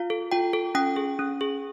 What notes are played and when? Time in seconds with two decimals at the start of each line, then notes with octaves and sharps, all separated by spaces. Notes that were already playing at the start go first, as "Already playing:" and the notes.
Already playing: F4 F5
0.10 A4
0.32 F4 G5
0.53 A4
0.75 C#4 G5
0.96 G#4
1.19 C#4
1.41 G#4